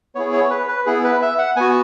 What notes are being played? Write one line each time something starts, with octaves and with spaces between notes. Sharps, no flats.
B3 E4 G#4 C#5
C#5
B4
B4
B3 E4 G#4
B4
E5
F#5
B3 F#4 G#5